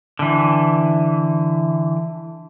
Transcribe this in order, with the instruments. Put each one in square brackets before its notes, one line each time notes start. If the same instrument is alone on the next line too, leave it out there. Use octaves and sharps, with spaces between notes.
[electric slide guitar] D3 E3